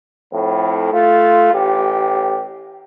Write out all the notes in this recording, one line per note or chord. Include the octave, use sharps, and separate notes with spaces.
F2 A2
A3 F4
A1 G4